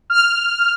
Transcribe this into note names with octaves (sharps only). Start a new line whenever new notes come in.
F6